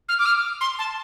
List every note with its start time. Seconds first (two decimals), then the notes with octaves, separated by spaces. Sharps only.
0.09 F6
0.19 D6
0.26 F6
0.61 C6
0.79 A5